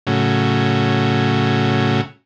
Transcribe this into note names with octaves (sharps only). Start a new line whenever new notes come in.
A2 C#3 F#3